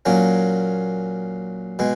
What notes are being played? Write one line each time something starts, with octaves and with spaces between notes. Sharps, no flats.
A#2 F#3 A#3 C#4
B2 G#3